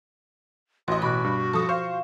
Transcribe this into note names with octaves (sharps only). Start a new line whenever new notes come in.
A1 F#4 D#5 C6
B2 F#4 B5 D6 F#6
G2
F3 A4 D#6 A#6
C5 F5 C#6